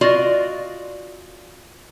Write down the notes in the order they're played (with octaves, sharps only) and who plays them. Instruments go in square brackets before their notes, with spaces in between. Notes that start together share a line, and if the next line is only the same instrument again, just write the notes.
[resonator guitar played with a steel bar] F4 F#4 D5 D#5